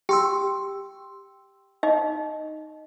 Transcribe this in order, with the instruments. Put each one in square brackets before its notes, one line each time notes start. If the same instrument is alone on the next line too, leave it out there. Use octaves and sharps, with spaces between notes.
[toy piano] G4 [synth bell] G5 C6 E6
[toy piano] D#4 D#5